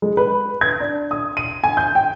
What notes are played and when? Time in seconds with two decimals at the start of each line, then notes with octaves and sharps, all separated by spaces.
0.02 G#3
0.17 B4
0.61 G#6
0.80 D4
1.11 D#6
1.37 D#7
1.64 G#5
1.77 G6
1.95 G5